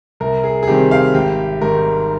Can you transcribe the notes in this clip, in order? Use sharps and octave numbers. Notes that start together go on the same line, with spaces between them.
C2 A#4
G#4
G#4
C3 D#3 G3 C4 G4
F5
G#1 G4
G#2 D#3 G3 A#4